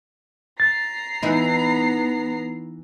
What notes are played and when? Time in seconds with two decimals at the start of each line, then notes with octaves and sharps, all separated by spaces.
0.60 A#5 A6 C7
1.22 E3 B3 D#4 E4